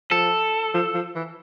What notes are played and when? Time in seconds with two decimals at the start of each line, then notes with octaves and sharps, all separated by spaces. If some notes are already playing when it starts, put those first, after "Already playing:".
0.11 F3 A4
0.74 F3
0.94 F3
1.15 E3